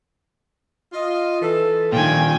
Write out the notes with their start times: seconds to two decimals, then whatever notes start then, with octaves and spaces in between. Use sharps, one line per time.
0.94 F4 D#5
1.42 E3 A4
1.92 A#2 D#3 F3 D4 F4 G5 G#5